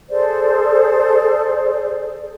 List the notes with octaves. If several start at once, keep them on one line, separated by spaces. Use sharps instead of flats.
G#4 A4 C5 D5